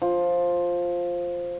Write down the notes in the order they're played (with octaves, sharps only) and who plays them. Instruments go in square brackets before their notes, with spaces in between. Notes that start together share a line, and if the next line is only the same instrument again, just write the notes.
[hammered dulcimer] F3